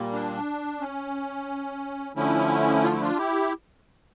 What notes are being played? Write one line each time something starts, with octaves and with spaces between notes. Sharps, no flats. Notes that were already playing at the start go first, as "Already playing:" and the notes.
Already playing: A#2 G3 A#3
D4
C#4
D3 F3 A3 C#4 E4
F4
E4
D4 F4
E4 G4